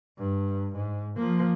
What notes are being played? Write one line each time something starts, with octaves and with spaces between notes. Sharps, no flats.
G2
G#2
F3 A#3